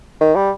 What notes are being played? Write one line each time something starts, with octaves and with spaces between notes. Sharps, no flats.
D#3
G3